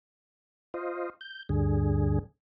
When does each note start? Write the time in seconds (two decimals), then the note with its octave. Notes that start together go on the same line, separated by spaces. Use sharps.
0.74 F4 C5 D#5
1.21 G6
1.49 D2 G2 D3 G#4